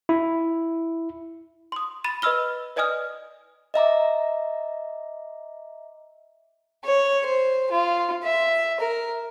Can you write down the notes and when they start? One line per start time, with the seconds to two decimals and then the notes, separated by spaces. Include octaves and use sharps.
0.09 E4
1.72 C6 D#6
2.04 B5 A6 D#7 E7
2.22 B4 D#5 B5 E6 F6 G7
2.76 B4 D5 D#5 G#5 D#6 F6
3.74 D#5 E5 A#5 D6
6.85 C#5
7.26 C5
7.72 F4
8.23 E5
8.81 A#4